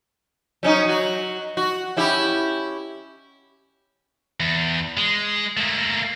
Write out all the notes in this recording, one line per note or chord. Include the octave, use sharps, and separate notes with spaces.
F#3 C#4 D#4
F#3 F#4
F#4
C#4 E4 G4
E2
G#3
A3 A#3